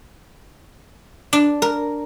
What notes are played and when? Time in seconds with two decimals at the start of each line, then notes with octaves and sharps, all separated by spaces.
1.33 D4
1.62 A#4